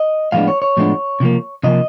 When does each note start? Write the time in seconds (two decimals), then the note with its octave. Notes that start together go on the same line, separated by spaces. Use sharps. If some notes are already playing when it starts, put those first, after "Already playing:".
Already playing: D#5
0.32 A2 F3 G#3 B3 D4 F5
0.48 C#5
0.62 C#5
0.77 A2 F3 G#3 B3 D4
1.20 C3 F3 A#3
1.63 C3 F3 A#3 D#5